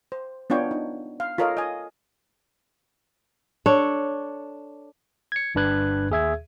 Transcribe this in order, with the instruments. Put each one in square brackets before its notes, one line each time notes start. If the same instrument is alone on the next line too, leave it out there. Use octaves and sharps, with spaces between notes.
[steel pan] C5
B3 D4 F4 C#5 G5
D#4
F5
F4 A4 A#4 C#5 D#5 F5
D#5 G#5
[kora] D4 A4 C#5
[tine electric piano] G#6 C#7
G1 G2 D4 B4 F#6 G#6
D#2 G#4 E5 G#6